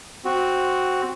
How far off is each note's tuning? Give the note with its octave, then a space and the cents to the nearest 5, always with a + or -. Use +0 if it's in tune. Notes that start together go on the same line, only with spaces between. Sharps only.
C4 +0 F#4 +0